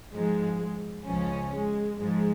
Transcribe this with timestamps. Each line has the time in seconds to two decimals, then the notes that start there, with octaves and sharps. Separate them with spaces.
0.12 G#2 F3 G#3
1.06 C#2 C#3 F3 C#4
1.52 G#3
1.99 G#2 F3 G#3